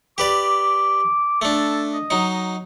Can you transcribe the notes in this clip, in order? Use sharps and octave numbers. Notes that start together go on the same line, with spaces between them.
G4 B4 D5 D6
A3 D4 A4
D#5
F#3 D#4